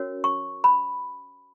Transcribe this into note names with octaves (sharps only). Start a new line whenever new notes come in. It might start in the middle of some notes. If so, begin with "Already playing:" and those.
Already playing: C#4 F#4 A#4 C#5
C#6
B5